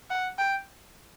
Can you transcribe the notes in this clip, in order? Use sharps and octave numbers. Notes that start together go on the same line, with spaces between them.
F#5
G5